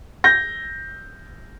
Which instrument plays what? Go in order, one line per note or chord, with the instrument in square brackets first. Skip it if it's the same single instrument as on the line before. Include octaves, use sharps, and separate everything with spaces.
[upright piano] G6 A#6